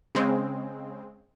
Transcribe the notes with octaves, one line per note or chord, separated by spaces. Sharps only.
C#3 G#3 C4